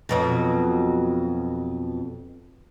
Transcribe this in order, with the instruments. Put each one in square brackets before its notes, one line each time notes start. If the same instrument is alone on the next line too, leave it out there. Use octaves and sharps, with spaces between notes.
[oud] F2 B2 F#3